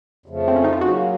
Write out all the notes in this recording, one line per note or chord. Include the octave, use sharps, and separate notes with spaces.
F2 C#3 F3 A3
C4
C#4
D#4
F4
C#3 F#3 A#3 C#4 F#4